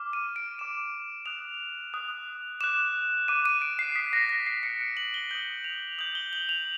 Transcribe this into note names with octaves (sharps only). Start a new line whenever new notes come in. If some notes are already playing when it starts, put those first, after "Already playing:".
Already playing: D6 F6
D#7
D7
D6 F6 E7
D#6 F#6 F7
D#6 F#6
D6 F#6 E7
D6 F#6 D#7
D#7
D7
C7
D#6 F#6 B6
A#6
B6
C7
D#6 F#6 C#7
D7
F#7
G7
D#6 G6 F#7
F7
D#6 G6 F#7
G7
F#7
F7